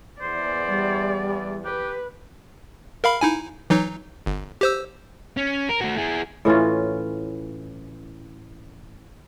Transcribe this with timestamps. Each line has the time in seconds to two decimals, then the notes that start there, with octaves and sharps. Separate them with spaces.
0.21 E2 C5 D5
0.69 G3
1.65 G4 B4
3.04 A#4 F5 B5
3.21 D#4 E4 G#5
3.70 E3 F#3 D#4
4.26 G1
4.61 G4 C5 E6
5.37 C#4
5.69 A#4
5.81 A3 F#4
5.97 E4 G#4
6.45 A2 E3 C#4 F4